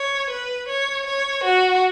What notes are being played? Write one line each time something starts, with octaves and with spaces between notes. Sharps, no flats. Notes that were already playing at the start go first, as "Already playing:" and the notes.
Already playing: C#5
B4
C#5
C#5
F#4